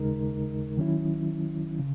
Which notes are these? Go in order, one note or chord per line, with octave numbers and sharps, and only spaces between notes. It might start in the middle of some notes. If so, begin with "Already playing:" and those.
Already playing: D#2 C#3 G#3 D#4 A#4
D#3 F#3 C#4 E4
C#3